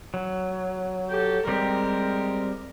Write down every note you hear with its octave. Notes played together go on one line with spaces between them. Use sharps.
F#3
G4 A4
G3 G#3 C4 G4 A#4